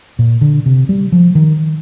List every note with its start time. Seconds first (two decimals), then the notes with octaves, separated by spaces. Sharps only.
0.19 A#2
0.41 D3
0.66 C3
0.89 G3
1.12 F3
1.35 D#3